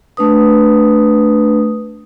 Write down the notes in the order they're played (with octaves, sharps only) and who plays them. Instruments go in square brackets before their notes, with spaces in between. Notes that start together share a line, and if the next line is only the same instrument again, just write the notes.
[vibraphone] A3 D4 B4 D#6